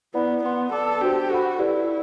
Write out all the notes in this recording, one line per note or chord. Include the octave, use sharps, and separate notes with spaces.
B3 E4 B4 D5 F#5 B5
B3 B4 F#5 C6
A4 B4 D5 A5 D6
D4 F#4 G4 C5
F#4 A4 C5 F#5 B5
E4 G4 B4 D5